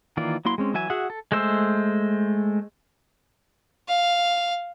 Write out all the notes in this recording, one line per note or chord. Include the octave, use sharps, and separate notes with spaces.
D#3 E3 A#3 F4 D5
F#3 A#3 E4 C6
G#3 C4 C#4
E3 F#3 E5 G#5
F#4 G#4 E5 F#5
A4
G#3 A3 C5 E6
F5